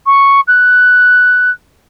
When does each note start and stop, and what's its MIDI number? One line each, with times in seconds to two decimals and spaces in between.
0.06 0.41 85
0.48 1.51 90